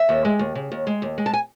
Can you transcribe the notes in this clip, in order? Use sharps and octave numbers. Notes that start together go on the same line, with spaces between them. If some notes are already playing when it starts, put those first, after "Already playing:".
Already playing: E5
D#2
G#3
D#2
C#3
D#2
G#3
D#2
G#3
A5
G#5